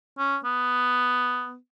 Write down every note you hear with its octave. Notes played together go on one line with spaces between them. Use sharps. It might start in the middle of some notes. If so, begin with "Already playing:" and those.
C#4
B3